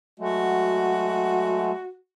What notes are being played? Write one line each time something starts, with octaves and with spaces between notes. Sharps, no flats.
F#3 G#3 A3 F#4